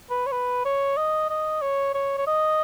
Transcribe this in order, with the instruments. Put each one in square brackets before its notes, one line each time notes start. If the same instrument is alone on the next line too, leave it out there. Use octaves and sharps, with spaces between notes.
[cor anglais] B4
C#5
B4
C#5
D#5
D#5
C#5
C#5
C#5
D#5